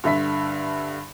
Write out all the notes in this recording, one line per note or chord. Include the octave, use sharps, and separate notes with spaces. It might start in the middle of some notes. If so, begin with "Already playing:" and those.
G2 D3 E5 B6